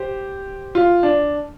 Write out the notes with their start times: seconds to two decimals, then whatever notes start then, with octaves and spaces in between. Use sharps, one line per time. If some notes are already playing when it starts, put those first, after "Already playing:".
Already playing: G4 C5
0.75 F4
1.03 D4